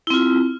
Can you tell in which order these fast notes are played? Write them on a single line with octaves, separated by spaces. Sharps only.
E4 C4 F4